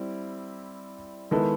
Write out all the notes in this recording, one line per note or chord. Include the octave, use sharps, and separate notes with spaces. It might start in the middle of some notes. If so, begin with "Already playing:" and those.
Already playing: G3 C4 E4
D#3 G#3 B3 E4 A4